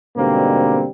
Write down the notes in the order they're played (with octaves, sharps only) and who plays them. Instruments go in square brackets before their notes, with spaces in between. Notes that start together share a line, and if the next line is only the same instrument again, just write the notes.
[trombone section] G#2 B2 D3 G3 A#3 C4